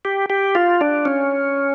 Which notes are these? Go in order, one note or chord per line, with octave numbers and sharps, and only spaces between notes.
G4
G4
F4
D4
C#4